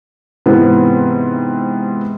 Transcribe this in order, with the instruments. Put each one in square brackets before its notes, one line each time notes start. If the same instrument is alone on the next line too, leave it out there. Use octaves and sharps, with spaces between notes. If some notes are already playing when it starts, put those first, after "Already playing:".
[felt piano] G#2 C3 E3 B3 C4 E4